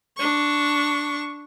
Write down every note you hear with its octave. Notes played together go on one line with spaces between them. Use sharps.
D4 C#6